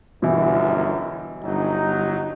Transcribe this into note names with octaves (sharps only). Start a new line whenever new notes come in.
G1 C#2 F#2 B2 E3
G1 F#3 D#4